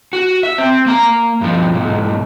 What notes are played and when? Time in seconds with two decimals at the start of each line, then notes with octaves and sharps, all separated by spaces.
0.13 F#4
0.43 E5
0.58 C4
0.86 A#3 A#5
1.41 G2 F3
1.75 B1 G#2